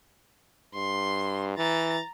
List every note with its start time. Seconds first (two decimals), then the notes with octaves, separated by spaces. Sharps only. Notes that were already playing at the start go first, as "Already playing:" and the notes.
0.74 G2 C6
1.57 E3 A#5 A6